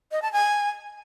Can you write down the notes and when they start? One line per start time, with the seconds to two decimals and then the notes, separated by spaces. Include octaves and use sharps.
0.12 D#5
0.22 A5
0.33 G#5